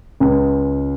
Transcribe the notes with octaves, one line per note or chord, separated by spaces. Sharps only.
C#2